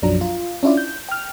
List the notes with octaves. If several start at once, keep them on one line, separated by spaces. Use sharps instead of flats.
B1 F#2 F3 F#3 D4 A#5
F4
C#4 D4 E4 F4 D5
G6
G5 F6